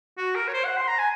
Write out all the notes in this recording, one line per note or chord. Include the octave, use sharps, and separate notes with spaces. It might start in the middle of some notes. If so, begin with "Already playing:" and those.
F#4
A#4
C#5
C5
F#5
C6
A#5
G#5